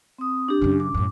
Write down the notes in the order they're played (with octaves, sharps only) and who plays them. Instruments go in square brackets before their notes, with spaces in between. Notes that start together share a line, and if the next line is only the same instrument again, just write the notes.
[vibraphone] C4 D#6
D4 G4
[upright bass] F#2 C#3
[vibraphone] D6
[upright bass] F#2 A2